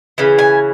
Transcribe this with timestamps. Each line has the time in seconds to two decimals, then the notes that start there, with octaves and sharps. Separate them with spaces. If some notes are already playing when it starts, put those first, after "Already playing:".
0.18 C#3 E3
0.38 G#5